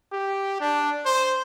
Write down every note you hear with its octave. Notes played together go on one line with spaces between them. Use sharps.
G4
D4
C5